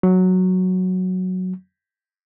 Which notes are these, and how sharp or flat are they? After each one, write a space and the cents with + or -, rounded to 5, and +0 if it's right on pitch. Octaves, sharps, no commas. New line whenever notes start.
F#3 -5